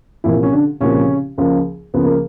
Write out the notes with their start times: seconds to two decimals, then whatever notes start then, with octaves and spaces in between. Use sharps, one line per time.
0.24 C2 A#2 E3 F3 A#3 E4
0.43 C#4
0.53 D3 D4
0.81 C2 A#2 C#3 F3 A#3 C#4
1.38 C#2 C#3 F3 A#3
1.94 C#2 C#3 F3 A#3 B3
2.05 A#3